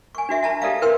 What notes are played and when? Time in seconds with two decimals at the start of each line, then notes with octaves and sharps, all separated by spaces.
0.15 G#5 C#6
0.29 D4 F#4 E5
0.43 E5 A5 A#5
0.62 G4 A4 D5 E5 F5
0.81 E4 A#4 B4 G5 C6 E6